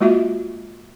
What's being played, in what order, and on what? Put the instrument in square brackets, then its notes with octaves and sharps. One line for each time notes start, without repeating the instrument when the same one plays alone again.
[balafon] G#3 A#3 F4 F#4 E5